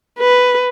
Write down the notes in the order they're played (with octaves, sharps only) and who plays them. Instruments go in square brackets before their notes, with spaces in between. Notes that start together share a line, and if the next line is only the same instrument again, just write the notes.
[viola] B4